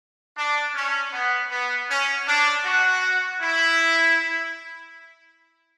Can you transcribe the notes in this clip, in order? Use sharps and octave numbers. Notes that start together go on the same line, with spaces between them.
D4
C#4
B3
B3
C#4
D4
F#4
E4